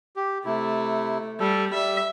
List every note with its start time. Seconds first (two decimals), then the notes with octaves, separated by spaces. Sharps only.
0.16 G4
0.45 C3 A3 E4
1.40 G3 A4
1.74 G3 E5